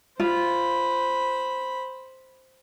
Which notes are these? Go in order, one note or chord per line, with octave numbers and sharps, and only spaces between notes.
F4 C5 B5